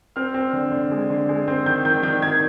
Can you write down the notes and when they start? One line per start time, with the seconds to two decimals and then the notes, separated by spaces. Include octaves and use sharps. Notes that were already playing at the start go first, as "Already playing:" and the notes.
0.16 C4 F6
0.34 C4
0.53 D3
0.72 D3
0.91 G#3
1.10 D3
1.29 G#3
1.48 C4
1.66 D#3 G6
1.85 D#3 G6
2.03 D#3 G6
2.22 D#3 G#6